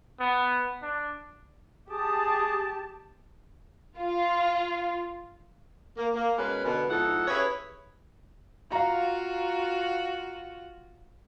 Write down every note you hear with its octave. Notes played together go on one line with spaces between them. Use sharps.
B3
D4
G4 G#4 A5 D#6
F4
A#3
A#3
B2 G#3 C#4 A#4 B4
B2 D3
F2 G#2 D#4 E4 A4 F#5
C#4 E4 G4 G#4 B4 C#5
F4 F#4 F5 A#5